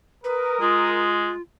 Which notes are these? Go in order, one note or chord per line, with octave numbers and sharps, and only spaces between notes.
A#4 B4 D#6
G#3 F4